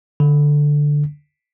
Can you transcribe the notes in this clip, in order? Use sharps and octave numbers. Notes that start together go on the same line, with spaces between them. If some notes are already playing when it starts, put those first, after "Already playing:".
D3